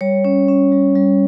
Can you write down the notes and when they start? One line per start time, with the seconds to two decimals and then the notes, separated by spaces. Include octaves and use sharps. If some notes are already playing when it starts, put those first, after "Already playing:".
0.01 G3 C#5
0.25 C#4
0.48 C#4
0.72 G3
0.95 G3